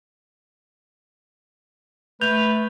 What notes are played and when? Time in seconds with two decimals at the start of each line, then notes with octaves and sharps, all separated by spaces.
2.21 A3 B4 G6 F7